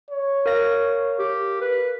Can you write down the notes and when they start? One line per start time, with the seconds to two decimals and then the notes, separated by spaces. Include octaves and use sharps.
0.10 C#5
0.46 A#4 F5 A#6
1.19 G4
1.61 B4